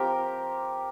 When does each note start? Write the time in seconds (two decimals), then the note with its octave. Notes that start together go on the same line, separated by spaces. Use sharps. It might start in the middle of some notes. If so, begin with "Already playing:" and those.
Already playing: F3 C4 F4 G4 A#4